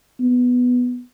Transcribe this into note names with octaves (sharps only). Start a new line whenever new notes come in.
B3